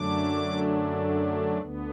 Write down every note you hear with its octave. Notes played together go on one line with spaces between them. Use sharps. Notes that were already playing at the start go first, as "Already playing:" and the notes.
Already playing: F#2 D3 F#3 A3 D4 D6
D2 D3 B3